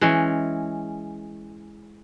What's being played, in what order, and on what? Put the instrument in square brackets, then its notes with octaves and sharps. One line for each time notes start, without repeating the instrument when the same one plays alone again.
[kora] E3 G#3 C#4